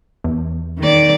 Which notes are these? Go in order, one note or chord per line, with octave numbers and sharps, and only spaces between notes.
E2
D#3 D5